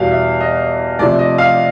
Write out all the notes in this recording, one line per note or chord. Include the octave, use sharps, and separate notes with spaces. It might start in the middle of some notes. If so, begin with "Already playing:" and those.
Already playing: E2 B2 G3 B3 F5
E5
D#5
C3 F3 A3 D5
D#5
F5